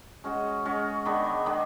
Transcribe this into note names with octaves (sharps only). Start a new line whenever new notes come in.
G#3 C#4 F#4
G#3 C#4 F#4
D#3 G#3 B3 D4
D#3 G#3 B3 D4